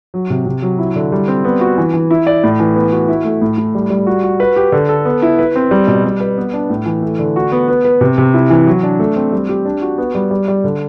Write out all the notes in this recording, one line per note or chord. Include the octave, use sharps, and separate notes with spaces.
F#3
C3
C3
F#3
E4
D3
G3
C4
B3
F#4
E3
E3
E4
D5
A2
E3
B3
F#4
E4
A3
A2
A2
G3
G3
F#4
F#4
B4
G4
D3
A4
B3
E4
B4
C4
G3
B2
G3
B4
B3
D4
A2
E3
A3
D3
F#4
B3
B3
B4
C3
C3
E4
E3
F#3
D4
A3
C4
G3
G4
D4
F#4
B3
G3
G3
G3
D3